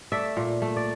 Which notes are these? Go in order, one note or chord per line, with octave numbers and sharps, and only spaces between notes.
A3 D5 E5
A#2
A3
D5